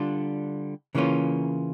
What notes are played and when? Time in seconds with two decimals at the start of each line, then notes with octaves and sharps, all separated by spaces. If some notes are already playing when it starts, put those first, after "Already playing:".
Already playing: D3 G3 D4 F4
0.95 C#3 E3 A#3 C#4 F4